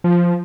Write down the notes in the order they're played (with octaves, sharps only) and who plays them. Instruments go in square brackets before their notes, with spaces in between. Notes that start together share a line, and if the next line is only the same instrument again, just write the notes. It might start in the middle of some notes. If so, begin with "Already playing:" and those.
[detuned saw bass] F3